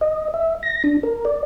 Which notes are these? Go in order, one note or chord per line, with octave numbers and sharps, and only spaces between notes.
D#5
E5
A#6
D4
A#4
D5